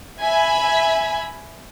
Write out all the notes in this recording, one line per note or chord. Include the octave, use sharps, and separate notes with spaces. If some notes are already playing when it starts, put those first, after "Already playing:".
E5 G#5 B5